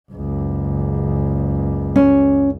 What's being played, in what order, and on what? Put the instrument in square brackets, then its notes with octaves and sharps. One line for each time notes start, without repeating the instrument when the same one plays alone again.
[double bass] F#1 C#2
[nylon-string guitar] C#4